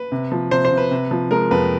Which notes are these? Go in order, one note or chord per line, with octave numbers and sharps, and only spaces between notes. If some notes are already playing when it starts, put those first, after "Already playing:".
Already playing: B4
C3
F3
C3 C5
C5
C3
B4
C3
F3
G#3 A#4
F2 B4